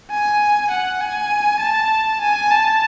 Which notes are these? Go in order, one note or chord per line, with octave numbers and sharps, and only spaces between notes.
G#5
F#5
G#5
A5
G#5
A5